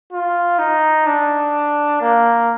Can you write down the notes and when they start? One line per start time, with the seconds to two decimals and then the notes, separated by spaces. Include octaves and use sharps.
0.12 F4
0.59 D#4
1.06 D4
2.01 A#3